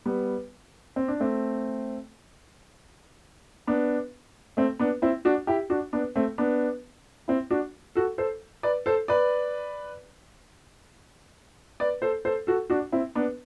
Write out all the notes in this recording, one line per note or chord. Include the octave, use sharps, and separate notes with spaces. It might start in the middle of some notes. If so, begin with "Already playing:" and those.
G3 B3
C4
D4
A3 C4
B3 D4
A3 C4
B3 D4
C4 E4
D4 F#4
E4 G4
D4 F#4
B3 D4
A3 C4
B3 D4
C4 E4
D4 F#4
F#4 A4
A4 C5
B4 D5
A4 C5
B4 D5
B4 D5
A4 C5
A4 C5
F#4 A4
D4 F#4
C4 E4
B3 D4